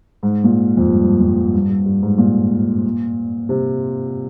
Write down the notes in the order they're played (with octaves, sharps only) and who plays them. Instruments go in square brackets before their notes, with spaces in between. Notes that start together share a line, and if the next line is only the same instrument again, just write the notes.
[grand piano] G#2
A#2
F2
G2
G2
F2
G2
G2
G2
G2
G#2
A#2
C3